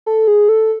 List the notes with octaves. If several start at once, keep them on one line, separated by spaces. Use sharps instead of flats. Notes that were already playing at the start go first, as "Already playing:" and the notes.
A4
G#4
A4